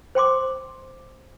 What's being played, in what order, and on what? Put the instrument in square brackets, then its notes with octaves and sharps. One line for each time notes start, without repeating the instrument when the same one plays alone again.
[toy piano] C5 G5 C6 D6